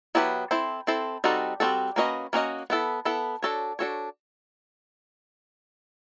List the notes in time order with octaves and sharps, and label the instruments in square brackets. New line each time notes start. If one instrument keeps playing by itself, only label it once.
[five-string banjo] F#3 B3 E4 G4 B4
C4 E4 A4 C5
C4 E4 A4 C5
G3 C4 D#4 F#4 A4
G3 C4 D#4 F#4 A4
A#3 C#4 F#4 B4 D#5
A#3 C#4 F#4 B4 D#5
B3 E4 A4
B3 E4 A4
D4 F#4 A4 C#5
D4 F#4 A4 C#5